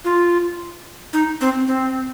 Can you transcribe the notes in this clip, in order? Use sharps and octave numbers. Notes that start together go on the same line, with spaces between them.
F4
D#4
C4
C4